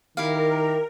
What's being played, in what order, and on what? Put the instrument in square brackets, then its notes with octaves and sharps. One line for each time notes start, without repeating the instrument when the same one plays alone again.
[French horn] D#3 [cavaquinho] E4 G4 F5 [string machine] A#4